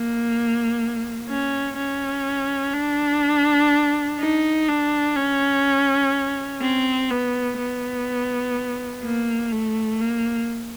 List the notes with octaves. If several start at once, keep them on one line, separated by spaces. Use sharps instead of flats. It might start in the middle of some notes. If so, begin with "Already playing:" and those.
Already playing: A#3
C#4
C#4
D4
D#4
D4
C#4
C4
B3
B3
A#3
A3
A#3